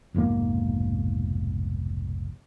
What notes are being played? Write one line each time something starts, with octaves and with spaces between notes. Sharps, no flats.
F1 B1 G#2 A#3